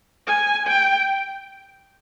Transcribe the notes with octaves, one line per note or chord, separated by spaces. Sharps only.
G#5
G5